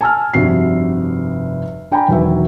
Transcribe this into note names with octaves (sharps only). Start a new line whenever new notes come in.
G#5 A5 E6 F6
F1 G2 C3 F#4 C7
D4 G5 G#5 A#5 B5
E1 D#3 F#3 B4 E5